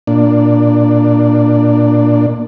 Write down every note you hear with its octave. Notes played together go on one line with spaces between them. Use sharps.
A#2 D4